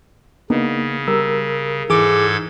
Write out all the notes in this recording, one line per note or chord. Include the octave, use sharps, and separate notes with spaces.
C#3 A#3 B3 D4 D#4
G3 A#4 E6
G#2 E3 G#4 A4 D6 G#6